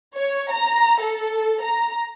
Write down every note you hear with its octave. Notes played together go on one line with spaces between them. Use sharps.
C#5
A#5
A4
A#5